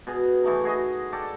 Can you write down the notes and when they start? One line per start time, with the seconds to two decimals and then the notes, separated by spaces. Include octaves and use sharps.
0.07 B2 G#4
0.44 E3 A3 D#4
0.63 F#4 G#4 D#5
1.12 A4 D5 G5